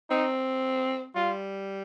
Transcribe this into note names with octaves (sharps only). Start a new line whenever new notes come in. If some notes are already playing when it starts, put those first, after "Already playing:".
C4 D#4
G3 F4